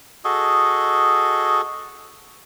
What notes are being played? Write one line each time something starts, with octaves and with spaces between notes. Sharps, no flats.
F#4 G#4 A4 D#5